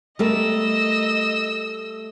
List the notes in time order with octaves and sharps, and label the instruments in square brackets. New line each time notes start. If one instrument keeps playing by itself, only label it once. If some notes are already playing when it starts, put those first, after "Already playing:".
[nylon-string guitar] G3 A3 A#4 [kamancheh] D#5 E6